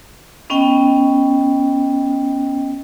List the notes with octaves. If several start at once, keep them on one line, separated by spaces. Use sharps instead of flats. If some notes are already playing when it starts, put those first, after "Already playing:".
B3 C#4 D#5 G5